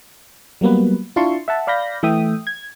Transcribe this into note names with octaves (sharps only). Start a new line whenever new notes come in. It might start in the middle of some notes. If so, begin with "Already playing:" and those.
F#3 G3 A#3 B3 B4
D4 E4 F4 A5 C6 C#6
E5 F#5 A5
D5 F5 B5 G6 A#6
E3 A3 E5 G5 D#6
G#6